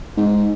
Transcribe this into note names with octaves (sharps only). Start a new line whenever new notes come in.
G#2